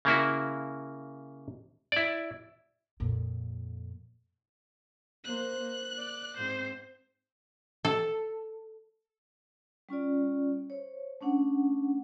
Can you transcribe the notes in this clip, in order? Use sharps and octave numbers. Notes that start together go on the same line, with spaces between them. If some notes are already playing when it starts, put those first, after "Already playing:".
C#3 A#3 E4 F#4
E4 D5
F2 A#2
A#3 C5 F#6
A#3
D5
G#2 C4 C5
A4
G3 C#4 F4 D5
C5 C#5
A3 C#4 D4 F#5